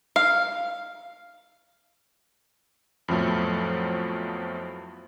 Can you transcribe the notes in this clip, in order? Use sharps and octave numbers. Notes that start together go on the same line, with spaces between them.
F5
F2 A2 F3 F#3 A3 B3